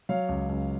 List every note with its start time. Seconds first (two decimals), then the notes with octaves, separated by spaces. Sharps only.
0.09 F#3 C#5 F5
0.29 C#2
0.49 C#2